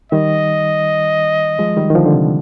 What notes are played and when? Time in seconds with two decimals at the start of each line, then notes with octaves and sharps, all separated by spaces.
0.12 D#3 G3 D#5
1.59 F3 G#3
1.77 D#3 G3
1.90 D#3
1.95 D3 F3
2.06 D3
2.14 C3